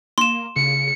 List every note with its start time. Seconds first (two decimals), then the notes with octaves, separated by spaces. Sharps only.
0.18 A#3 C6 E7
0.56 C#3 C#7